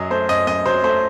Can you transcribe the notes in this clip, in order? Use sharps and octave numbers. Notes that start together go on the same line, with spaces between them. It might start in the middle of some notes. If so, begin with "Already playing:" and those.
Already playing: F#2 F#3 D#5
A3 C5
F#2 D#5
F#2 D#5
F#3 C5
A3 C5